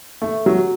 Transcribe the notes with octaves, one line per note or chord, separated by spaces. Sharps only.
A3
F#3